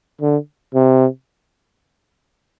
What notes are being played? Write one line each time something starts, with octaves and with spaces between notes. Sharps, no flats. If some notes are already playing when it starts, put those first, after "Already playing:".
D3
C3